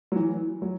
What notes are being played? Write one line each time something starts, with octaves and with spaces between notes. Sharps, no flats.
F#3
E3
F#3